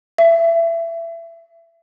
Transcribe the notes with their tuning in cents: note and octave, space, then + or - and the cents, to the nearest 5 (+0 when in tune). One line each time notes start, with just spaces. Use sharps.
E5 +25